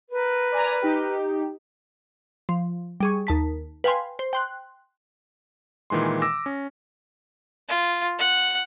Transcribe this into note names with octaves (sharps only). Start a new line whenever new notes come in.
A#4 B4
D5 G#5 A#5
D#4 G4
F3
G3 G#4 C#6
D#2 A5 B6
B4 F5 G5 G#5 C6
C5
G5 C6 F#6
A#2 D#3 E3 G#3 C6
D6 E6 A#6
C#4
F4
F#5